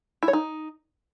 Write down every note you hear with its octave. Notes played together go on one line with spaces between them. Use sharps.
E4
C#5
D#4